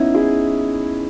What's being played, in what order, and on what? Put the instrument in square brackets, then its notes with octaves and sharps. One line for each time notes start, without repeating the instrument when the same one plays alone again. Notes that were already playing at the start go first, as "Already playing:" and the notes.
Already playing: [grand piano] B3 C#4 D#4 E4
E4 G#4